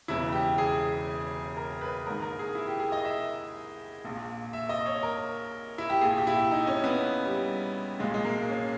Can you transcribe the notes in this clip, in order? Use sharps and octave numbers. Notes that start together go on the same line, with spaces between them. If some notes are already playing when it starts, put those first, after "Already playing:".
E1 E2 C#3 E3 E4
G4
G#4
A#4
B4
A#1 G#2 D#3 A#4
A#4
G#4
E4
G4
G#4
D#5
E5
A#1 A#2
E5
D#5
C#5
A#4
E4
G4
A#1 A#2 G#4
G4
E4
G4
D#4
C#4
B3
G3
B1 A#2 G#3
G#3
A#3
C#4